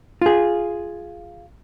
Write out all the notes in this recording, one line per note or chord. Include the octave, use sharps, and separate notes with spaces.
F4 G#4